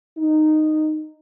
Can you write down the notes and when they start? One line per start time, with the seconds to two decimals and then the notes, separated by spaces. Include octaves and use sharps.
0.19 D#4